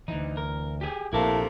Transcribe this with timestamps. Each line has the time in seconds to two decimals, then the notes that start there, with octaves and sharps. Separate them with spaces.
0.08 D2 E3 D#4
0.37 A#4
0.81 G4 G#4
1.13 A#1 C3 A3 A#3 E4 A5